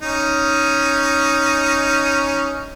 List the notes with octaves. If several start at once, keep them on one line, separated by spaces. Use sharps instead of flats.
C#4 D#4